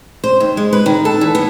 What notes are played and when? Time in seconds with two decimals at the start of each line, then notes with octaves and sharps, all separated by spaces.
0.24 C5
0.40 D#2
0.57 G#3
0.73 B4
0.86 D#3
1.05 A4
1.21 E3
1.35 B3